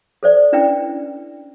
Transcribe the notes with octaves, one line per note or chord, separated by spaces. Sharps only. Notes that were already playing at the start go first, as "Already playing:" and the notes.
A4 C5 D5
C#4 D4 E4 B4 G5